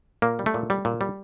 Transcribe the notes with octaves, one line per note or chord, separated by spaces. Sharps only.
A#2 A#3
G3
A3
A#2
G3
A#2
G3